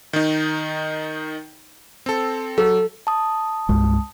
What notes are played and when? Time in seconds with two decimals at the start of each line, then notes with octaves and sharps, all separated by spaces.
0.13 D#3 D#4
2.06 C4 A4
2.58 F#3 A4
3.07 A5 D#6
3.69 C2 G2 G#3